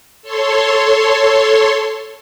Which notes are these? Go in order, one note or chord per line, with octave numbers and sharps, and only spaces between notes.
A4 C#5 C6